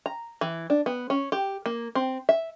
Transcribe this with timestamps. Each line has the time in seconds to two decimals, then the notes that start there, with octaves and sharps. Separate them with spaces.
0.06 A#5
0.41 E3
0.70 D4
0.86 B3
1.10 C#4
1.32 G4
1.66 A#3
1.95 C4
2.29 E5